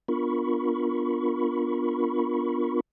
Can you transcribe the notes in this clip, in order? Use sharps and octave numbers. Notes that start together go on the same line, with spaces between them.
B3 D4 F4 A#4 B5 C#6